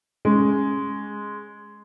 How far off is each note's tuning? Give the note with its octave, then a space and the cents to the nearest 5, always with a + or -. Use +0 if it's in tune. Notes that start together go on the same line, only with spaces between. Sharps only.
G#3 +0 C#4 +0